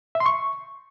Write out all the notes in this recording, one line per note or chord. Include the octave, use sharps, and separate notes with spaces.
E5
C6
C#6